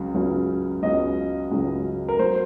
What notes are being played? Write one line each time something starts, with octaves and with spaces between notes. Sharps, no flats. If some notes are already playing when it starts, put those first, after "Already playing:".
Already playing: C#2 C#3 F#3
C#2 C#3 F#3
C#2 C#3 F#3 D#5
C#2 C#3 F#3
A#4
F#3 C5